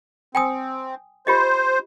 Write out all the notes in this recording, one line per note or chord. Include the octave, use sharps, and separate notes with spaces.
C4 G5 G#5 D#6
F4 G4 C5 D#5